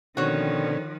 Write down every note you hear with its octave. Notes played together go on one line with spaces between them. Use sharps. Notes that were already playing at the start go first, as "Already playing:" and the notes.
B2 D3 D#3 F3 C4 C#4 F#4 C#5